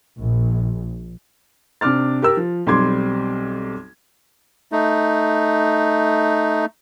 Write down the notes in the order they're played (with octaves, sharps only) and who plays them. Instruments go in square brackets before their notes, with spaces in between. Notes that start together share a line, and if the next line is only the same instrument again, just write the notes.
[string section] A#1
[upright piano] C3 D4 D6 F6 A6
G4 A#4 E6
F3
B1 G3 C4 C6 D6 G#6
[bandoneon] A3 D#4